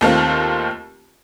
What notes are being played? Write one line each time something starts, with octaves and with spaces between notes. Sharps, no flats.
D#2 D#3 A3 C4 F4